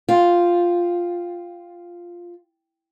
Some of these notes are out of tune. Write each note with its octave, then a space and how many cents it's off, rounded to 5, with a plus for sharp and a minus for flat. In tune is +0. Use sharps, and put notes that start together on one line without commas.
F4 +0 G5 +0